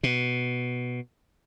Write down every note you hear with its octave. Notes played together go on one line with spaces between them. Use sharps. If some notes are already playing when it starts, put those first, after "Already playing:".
B2